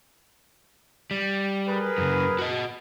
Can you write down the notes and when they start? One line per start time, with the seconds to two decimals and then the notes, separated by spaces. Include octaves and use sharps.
1.11 G3
1.67 G#4 A#4 B4
1.98 F#2 C#3
2.39 F#4 D#5